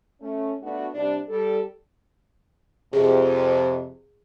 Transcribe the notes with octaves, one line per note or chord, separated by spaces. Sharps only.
A3 C#4
A3 B3 D4 F#4
C3 G3 D4
G3 A4
F2 C3 G#4